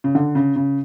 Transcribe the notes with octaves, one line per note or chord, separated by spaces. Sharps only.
C#3
D3
C#3
C#3